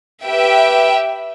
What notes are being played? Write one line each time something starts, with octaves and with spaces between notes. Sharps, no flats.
G4 B4 E5 G5